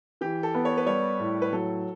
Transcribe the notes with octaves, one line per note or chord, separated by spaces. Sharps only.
E3 G4
A4
B3
C#5
B4
G3 C#5
A2
B4
F#3 A4